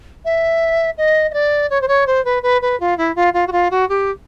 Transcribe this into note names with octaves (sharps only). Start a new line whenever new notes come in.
E5
D#5
D#5
D5
C#5
C5
C#5
C5
B4
B4
B4
F4
E4
F4
F4
F#4
F4
F#4
G4